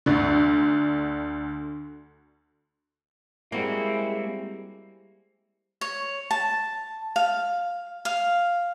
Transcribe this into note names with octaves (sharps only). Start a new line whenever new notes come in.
D2 D3
G3 G#3 A#3 C4 E4 F#4
C#5
A5
F5
F5